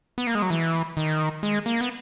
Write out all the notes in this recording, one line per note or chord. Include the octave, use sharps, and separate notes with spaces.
B3
A#3
G#3
F#3
E3
D#3
G#3
A#3
B3